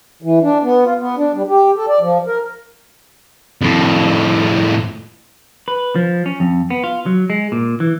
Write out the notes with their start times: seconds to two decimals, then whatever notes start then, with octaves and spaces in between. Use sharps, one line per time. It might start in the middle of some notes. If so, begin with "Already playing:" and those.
0.22 E3
0.42 D4
0.63 B3
0.84 F4
0.99 B3
1.17 D4
1.34 G3
1.48 G4
1.76 A4
1.88 D5
2.00 F3
2.27 A#4
3.62 F2 A2
5.68 B4
5.96 F3
6.26 C#4
6.40 F2
6.70 B3
6.84 F4
7.06 F#3
7.30 G#3
7.52 A#2
7.80 E3